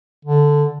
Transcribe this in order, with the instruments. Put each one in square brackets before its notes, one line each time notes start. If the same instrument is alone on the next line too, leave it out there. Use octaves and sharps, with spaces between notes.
[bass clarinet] D3